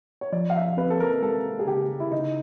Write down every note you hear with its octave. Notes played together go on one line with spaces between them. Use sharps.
C#5
F3 D5
F5
E5
C4 B4
A4
A#4
G#3 A4
G#4
C#3 G4
E4
C#3 D#4